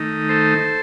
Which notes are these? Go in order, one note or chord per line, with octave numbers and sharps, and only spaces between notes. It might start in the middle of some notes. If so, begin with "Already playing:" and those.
Already playing: D#3 A3 D#4
A4 C5